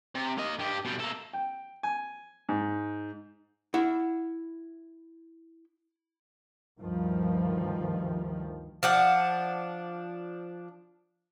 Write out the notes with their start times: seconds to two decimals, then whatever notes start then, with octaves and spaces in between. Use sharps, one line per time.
0.15 C3
0.38 A#3 D#5
0.59 G2 G4
0.85 B2 G3
1.00 A#3 A4
1.33 G5
1.83 G#5
2.49 G#2
3.74 E4 F#5
6.78 D2 G2 D#3 F3
8.83 F3 D4 F#5